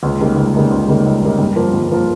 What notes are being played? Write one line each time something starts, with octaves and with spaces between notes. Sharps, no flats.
C#2
C#3 G3 A#3 D#4
C#2
C#3 G3 A#3 D#4
C#2
C#3 G3 A#3 D#4
C#2
C#3 G3 A#3 D#4
G2
F3 A#3 F4 A#4
G2
F3 A#3 F4 A#4